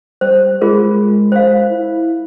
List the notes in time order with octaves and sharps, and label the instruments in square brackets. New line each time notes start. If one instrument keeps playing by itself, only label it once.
[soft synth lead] G3 [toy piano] C5
[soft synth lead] G#3 [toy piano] F4 G#4 A#4
[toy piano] C5 F5
[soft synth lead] E4